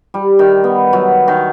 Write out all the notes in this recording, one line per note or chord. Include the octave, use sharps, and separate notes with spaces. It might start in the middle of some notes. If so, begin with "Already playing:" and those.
G3
D#3
B3
F#3
D#3